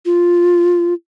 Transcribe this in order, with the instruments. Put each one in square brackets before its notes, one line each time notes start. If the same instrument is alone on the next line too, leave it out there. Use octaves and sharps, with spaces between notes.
[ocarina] F4